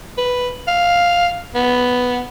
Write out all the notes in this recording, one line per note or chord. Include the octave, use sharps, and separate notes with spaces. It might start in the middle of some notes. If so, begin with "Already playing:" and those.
B4
F5
B3